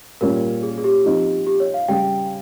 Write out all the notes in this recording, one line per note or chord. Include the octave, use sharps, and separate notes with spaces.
A#2 G3 C#4 A#4
G#4
G#4
G4
F3 C4 D#4
G4
C#5
F5
C#3 G3 C#4 G5